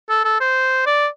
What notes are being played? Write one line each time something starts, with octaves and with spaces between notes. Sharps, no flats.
A4
A4
C5
D5